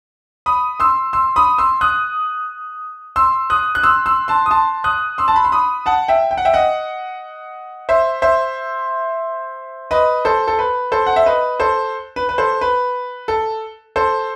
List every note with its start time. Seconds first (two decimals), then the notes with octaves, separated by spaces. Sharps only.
0.46 B5 D#6
0.80 C6 E6
1.13 C6 E6
1.36 B5 D#6
1.58 C6 E6
1.81 D#6 F#6
3.16 C6 E6
3.50 D#6 F#6
3.75 F#6
3.83 C6 E6
4.06 C6 E6
4.28 A5 C6
4.46 D#6
4.51 A5 C6
4.84 D#6 F#6
5.18 C6 E6
5.28 A5
5.36 B5
5.44 C6
5.52 B5 D#6
5.86 F#5 A5
6.08 E5 G5
6.31 G5
6.37 F#5
6.45 E5 G5
6.53 D#5 F#5
7.89 C5 E5
8.22 C5 E5
9.91 B4 D#5
10.25 A4 C5
10.47 A4
10.59 B4
10.92 A4 C5
11.07 F#5
11.16 E5
11.26 B4 D#5
11.60 A4 C5
12.16 B4
12.29 B4
12.38 A4 C5
12.61 B4
13.28 A4
13.96 A4 C5